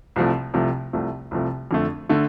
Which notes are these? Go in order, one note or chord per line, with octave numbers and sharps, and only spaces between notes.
C2 C3 F3 A3
C2 C3 F3 A3
C2 C3 F3 A3
C2 C3 F3 A3
F2 D3 A3
D3 A3